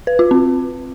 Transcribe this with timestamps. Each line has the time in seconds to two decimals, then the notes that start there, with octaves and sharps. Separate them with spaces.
0.07 B4
0.19 F4
0.31 C4